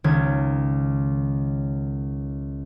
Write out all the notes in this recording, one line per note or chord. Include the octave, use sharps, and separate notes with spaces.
C#2 D#3 G#6